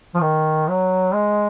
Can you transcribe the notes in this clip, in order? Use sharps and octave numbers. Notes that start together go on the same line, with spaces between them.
F3
D#3
F#3
G#3